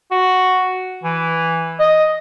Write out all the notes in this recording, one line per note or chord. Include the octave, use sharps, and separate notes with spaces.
F#4
E3
D#5